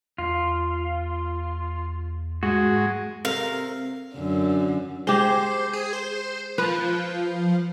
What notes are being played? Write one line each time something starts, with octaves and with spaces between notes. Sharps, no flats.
E2 F4
G#2 G#3 F#4
C3 A4 A#4 F5
F#2 D3
G#3 G4 C5
G#4
C5
F3 B4